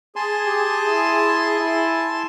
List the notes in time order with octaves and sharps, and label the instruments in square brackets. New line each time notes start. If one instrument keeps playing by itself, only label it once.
[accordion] G#4 [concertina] G#5 A5 C6
[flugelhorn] G4
E4
E4